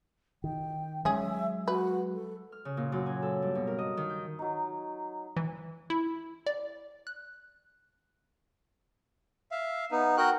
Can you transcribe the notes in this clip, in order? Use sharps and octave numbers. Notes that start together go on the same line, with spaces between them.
D#3 G5
F#3 G#3 C#4 G#4 E5
F#4 B4
A4
F6
C#3
A#2
F#2
G#5
A4
G2
B2
A#4
D#5
D#3
G6
F#3 D#4
E3
E4
D5
F#6
E5 F5
B3 D#4
F#4 A#4 G5 F#6